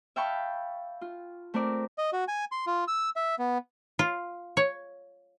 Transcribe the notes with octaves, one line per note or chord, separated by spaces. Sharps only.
E5 F5 G5 A5 B5 C#6
F4
A3 C4 A#4 C5 D5
D#5
F#4
G#5
C6
F4
E6
E5
B3
F4
C#5